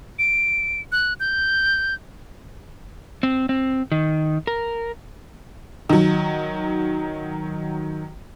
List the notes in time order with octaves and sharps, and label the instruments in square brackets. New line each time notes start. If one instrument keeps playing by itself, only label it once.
[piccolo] D7
F#6
G6
[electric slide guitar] C4
C4
D#3
A#4
[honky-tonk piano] D#3 F#3